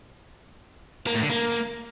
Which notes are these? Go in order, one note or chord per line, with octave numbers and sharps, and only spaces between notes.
A#3
A2
D3
A#3